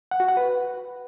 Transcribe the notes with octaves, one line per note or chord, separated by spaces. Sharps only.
F#5
F#4
F#5
B4